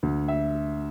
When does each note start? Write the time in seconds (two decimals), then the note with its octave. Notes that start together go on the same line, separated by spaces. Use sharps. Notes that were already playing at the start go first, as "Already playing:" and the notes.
0.03 D2
0.28 E5